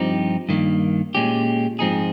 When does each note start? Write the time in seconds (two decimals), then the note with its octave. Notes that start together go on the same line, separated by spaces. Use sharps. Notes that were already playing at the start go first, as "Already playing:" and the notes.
Already playing: G2 F3 C4 D#4 G4
0.49 G2 D#3 A#3
1.15 A#2 G#3 C#4 G4
1.79 G#2 F3 C4 D#4 G#4